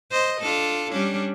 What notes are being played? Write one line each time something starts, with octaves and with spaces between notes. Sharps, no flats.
C5 D#5
D4 F4 A4
G3 C#4 D4